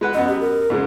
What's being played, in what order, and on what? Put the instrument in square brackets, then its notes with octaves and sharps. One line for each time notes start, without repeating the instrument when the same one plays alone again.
[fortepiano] G#3 B4 F#5
[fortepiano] F#2 B3 [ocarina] D#5
[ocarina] G4
A#4
[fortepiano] G#2 C#3 G#3